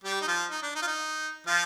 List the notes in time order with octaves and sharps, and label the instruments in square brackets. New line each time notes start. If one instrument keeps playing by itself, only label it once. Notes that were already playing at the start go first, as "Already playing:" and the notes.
[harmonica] G3 G4
D#4
F3 F4
D#4
D4
D#4
F4
D#4
F3 F4